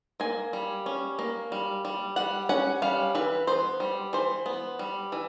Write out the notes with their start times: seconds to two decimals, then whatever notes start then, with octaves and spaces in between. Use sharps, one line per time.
0.20 A#3 G#5
0.53 G3
0.86 C#4
1.19 A#3
1.52 G3
1.85 G3
2.16 G3 F#5
2.49 C#4 F#5
2.82 G3 F5
3.15 E3 B4
3.47 B3 C5
3.80 G3
4.13 E3 C5
4.46 B3
4.79 G3
5.12 E3